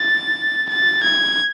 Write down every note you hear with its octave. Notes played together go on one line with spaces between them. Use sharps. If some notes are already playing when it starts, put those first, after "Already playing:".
Already playing: A6
A6
G#6